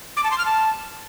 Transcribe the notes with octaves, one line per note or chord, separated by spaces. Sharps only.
D6
A5
C6
F6
A5